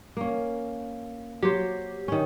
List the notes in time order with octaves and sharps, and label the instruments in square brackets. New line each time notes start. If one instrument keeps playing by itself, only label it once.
[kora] A#3 C#4
[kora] F#3 C5 [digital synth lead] G4
[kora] D#3 C#4